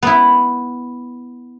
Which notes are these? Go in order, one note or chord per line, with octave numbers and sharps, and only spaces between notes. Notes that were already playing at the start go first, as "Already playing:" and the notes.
B3 E4